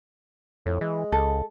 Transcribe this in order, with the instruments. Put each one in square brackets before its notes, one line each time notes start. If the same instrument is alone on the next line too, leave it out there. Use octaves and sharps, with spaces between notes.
[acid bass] F2 [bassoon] A2
[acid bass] E3 [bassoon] G#3
[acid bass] C#2 [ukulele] A4